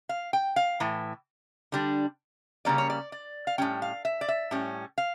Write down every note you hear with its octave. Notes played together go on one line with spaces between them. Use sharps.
F5
G5
F5
A2 E3
D3 G3 D4
C#3 G3 A#3 C#4 D5
C#5
D5
D5
F5
A2 G3 C#4 G5
F5
E5
D5
E5
A2 G3 C#4
F5